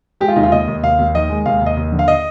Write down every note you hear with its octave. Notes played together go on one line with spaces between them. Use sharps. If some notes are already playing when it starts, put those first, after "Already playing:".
G#3 G4
F4
D#2 D#4
F4
D#2 D#5
D#2
D#2 F5
D#2
D#3 D#5
G#3
D#2 F5
D#2
D#5
D#2
D3
F5
D#5